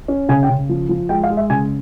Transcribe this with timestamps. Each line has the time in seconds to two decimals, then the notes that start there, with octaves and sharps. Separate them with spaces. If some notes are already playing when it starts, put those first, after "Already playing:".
0.08 C#4
0.29 C#3 G#5
0.43 G5
0.49 C#3
0.69 F3
0.89 F3
1.09 G#3 G5
1.23 F5
1.30 G#3
1.37 E5
1.50 C#3 G#5